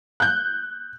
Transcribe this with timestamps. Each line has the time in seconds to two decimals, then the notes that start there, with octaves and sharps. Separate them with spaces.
0.20 F#6 G6